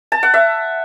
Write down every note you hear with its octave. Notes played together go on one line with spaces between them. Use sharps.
A5
F#5
E5